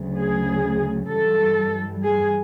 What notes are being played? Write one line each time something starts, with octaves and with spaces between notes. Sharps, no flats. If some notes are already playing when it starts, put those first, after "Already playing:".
Already playing: D2 C#3 F#3 A3
G#4
G2 E3 G3 A4
G#4